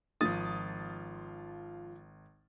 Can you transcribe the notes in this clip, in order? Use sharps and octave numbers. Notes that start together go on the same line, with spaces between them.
G#1 F3 F4 D#6 A6